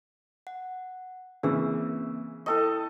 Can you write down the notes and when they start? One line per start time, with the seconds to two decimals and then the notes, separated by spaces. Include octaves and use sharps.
0.47 F#5
1.43 C#3 E3 A#3 C4 E6
2.46 E4 A4 D#5 G5 C#6